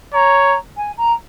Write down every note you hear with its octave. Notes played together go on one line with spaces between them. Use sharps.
C#5 A#5
G#5
A#5